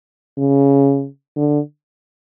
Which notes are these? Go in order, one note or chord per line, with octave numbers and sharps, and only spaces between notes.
C#3
D3